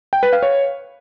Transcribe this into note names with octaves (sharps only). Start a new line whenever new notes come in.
G5
B4
F5
C#5